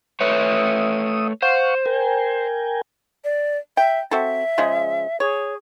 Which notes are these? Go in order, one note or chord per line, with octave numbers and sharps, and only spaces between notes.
A3 B4 C#5 E5 D#6
C5 F5 F#5 C#6
A#4 G5 G#5
D5
E5 G5
C4 F#4 A4 E5
C#3 F3 G#3
G#4 C#5